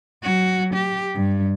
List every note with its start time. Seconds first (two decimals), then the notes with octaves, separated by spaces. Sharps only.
0.23 F#3 F#4
0.74 G4
1.14 G2